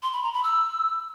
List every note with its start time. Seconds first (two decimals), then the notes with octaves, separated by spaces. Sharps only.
0.02 C6
0.13 B5
0.23 A#5
0.33 B5
0.43 E6